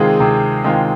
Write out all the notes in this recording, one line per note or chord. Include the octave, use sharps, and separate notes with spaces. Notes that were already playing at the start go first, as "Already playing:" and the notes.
Already playing: C3 D#3 G#3 C4 F4 G#4
C3
D#3 G#3 C4 F4